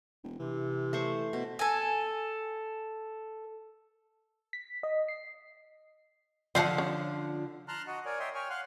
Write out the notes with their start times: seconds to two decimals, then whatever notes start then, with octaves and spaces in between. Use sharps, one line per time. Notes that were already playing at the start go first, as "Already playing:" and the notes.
0.24 E1
0.40 C3 E3
0.93 A3 C5 C#6
1.33 B2
1.59 A4 G#5
4.53 B6
4.83 D#5
5.08 C7
6.55 D3 F3 F4 C5 F5 F#5 G#5 A5
6.78 C#4
7.68 A5 A#5 C6 F6 F#6
7.87 F#4 D#5 F#5
8.05 A#4 C#5 D5 G#5
8.19 C#5 D#5 E5 G5 C6
8.35 C#5 G5 G#5 C#6 F6
8.50 F5 F#5 C6 F6 F#6